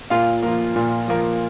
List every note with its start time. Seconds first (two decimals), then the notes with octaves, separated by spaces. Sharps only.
0.10 A#2 F4 F5
0.43 F3 A#3
0.76 A#2
1.08 F3 A#3